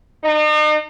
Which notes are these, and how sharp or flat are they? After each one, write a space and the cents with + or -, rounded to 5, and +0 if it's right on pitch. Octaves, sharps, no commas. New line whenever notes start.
D#4 -40